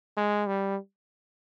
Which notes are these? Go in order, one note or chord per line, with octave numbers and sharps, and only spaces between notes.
G#3
G3